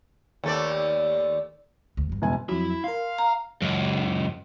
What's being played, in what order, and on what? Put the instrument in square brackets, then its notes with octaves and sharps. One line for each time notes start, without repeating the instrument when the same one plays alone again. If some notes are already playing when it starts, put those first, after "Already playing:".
[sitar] D#2 A3 D5
[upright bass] D2
G2 B2
[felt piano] E1 G#5
[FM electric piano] F2 F#3 [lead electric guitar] E4
[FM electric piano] A#4 C6 [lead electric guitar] F5
[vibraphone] A#5
[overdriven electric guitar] C#2 F#2